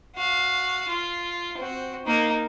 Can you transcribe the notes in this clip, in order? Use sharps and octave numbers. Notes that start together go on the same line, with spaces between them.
F#4 F5
F4
C4 F#4
A#3 D#4